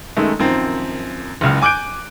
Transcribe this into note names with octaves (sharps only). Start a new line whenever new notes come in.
F#2 D#3 G#3 A3
F#2 D#3 F3 C4
F#1 C#2 F6
G#5 D6 F#6 G6 D7